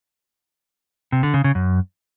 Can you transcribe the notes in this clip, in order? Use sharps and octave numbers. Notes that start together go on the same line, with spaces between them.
C3
D3
C#3
C#3
F#2